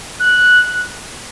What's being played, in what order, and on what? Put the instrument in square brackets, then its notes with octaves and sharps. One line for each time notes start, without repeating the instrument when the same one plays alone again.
[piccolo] F#6